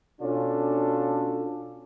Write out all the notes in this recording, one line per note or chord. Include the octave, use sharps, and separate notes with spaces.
B2 C#4 D4 F4 A4